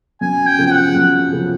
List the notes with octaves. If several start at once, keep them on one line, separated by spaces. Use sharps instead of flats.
F#2 G#5
G5
C#3 F3
G5
F#5
F#2
C#3 F3